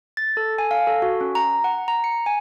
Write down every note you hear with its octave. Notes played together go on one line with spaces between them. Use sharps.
A6
A4
G#5
F5
A4
F#4
C#4
A#5
F#5
A#5
C#7
G#5